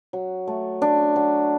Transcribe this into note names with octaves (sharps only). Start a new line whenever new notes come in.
F#3
A3
D4
F#3